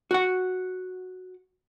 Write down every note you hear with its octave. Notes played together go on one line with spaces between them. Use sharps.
F#4 F#5